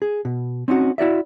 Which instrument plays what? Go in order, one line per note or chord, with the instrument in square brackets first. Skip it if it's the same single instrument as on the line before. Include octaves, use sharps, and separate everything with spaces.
[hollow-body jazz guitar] G#4
B2
C4 C#4 D#4 F#4
E4 F#4 D5 E5